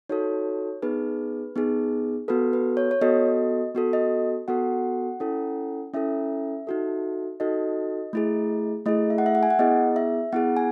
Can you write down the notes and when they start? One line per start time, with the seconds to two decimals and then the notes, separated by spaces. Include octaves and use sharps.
0.09 D#4 F#4 A4 C#5
0.82 B3 D#4 G#4 B4
1.56 B3 D#4 G#4
2.28 B3 F#4 A4 B4
2.53 B4
2.77 C#5
2.91 C#5
3.01 B3 F#4 A4 D#5
3.75 B3 F#4 A4
3.93 D#5
4.48 B3 F#4 A4 F#5
5.20 C#4 E4 A4
5.94 C#4 E4 A4 E5
6.67 D#4 F#4 A4
7.40 D#4 F#4 A4 D#5
8.13 A3 E4 G#4
8.86 A3 E4 G#4 D#5
9.10 E5
9.18 F#5
9.26 E5
9.35 F#5
9.43 G#5
9.50 F#5
9.59 B3 E4 G#4 D#5
9.96 E5
10.32 B3 E4 G#4 F#5
10.57 G#5